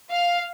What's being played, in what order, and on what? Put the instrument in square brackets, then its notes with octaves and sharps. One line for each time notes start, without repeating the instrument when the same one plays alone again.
[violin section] F5